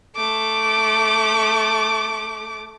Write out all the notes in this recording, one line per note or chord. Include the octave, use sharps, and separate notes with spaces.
A3 D6